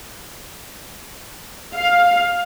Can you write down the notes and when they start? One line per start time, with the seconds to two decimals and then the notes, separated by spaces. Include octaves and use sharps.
1.76 F5